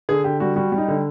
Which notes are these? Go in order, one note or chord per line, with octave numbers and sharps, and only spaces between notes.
D3 G#4
D3 G4
G3 F#4
G3 F#4
G3
D#4
D3